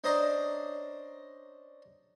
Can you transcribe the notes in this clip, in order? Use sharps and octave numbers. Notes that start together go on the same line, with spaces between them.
C#4 D4 C5 D5 D#5 A#5